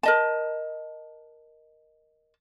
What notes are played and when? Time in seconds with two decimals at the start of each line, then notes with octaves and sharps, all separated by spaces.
0.03 A#4 D#5 A5